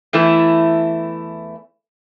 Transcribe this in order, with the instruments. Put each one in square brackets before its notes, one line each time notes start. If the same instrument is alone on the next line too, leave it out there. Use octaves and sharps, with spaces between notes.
[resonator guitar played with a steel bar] E2 E3 A3 E4